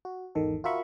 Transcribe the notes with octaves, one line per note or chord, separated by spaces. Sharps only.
F#4
G#1 E2 D#3 A4
F4 F#4 A#4 E5 B5 C#6